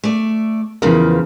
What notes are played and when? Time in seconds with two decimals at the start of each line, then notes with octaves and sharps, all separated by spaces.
0.04 A3 D5
0.82 E2 C#3 E3 F3 A#4